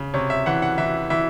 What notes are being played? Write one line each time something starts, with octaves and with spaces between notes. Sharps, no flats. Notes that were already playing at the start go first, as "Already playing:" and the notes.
Already playing: C#3
C3 C#5
E5
E3 F#5
F#5
E3 E5
E3 E5